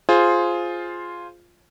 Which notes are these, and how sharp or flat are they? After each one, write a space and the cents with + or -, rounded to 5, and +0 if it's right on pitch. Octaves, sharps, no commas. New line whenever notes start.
F4 +0 G#4 +10 C5 +0